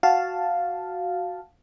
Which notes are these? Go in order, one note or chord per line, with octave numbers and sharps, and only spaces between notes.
F#4 F5 A5